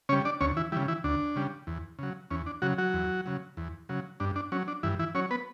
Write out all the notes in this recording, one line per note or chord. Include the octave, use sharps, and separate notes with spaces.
C#3 G3 C#4 C#5
D4 D5
D2 C#4 C#5
E3 E4
C#3 E3 G3 E4
E3 E4
D2 D4
C#3 G3
E2
C#3 F#3
E2 C#4
D4
C#3 F#3 F#4
F#3 F#4
E2
C#3 F#3
E2
C#3 F#3
G2 D4
D4
F#3 C#4
D4
G2 E3 E4
E3 E4
F#3 C#4 C#5
B3 B4